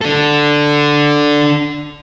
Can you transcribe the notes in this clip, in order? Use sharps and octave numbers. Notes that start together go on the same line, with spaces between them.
D4 A4